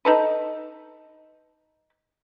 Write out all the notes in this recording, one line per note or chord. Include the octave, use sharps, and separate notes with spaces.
D#4 A4 B4